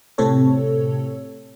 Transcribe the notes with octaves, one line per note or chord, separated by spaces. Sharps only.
A2 C3 C4 A4 C#5